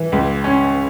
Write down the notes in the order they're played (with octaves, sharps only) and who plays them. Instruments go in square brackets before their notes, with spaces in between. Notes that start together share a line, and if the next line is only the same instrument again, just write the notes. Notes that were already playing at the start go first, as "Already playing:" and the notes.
Already playing: [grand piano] E3
C#2
C#4